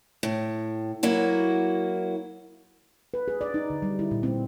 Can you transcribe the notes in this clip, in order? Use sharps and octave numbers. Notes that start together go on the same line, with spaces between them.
A2
F#3 A#3 E4 F#4
B4
G#4
D5
D#4
D3
G3
E4
A#2
C4